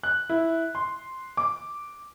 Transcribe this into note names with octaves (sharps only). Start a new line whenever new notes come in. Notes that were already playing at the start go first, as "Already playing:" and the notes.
F#6
E4
C6
D6